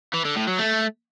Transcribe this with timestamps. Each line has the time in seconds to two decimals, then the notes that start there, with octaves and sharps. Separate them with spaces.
0.14 E3
0.25 D3
0.36 A2
0.48 F#3
0.59 A3